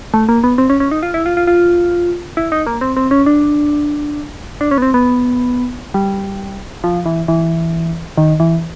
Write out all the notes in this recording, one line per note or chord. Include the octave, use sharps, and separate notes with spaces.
A3
A#3
B3
C4
C#4
C#4
D#4
F4
E4
F4
F4
F4
E4
D#4
A#3
C4
C4
C#4
D4
D4
C#4
B3
C4
B3
G3
F3
E3
E3
D#3
E3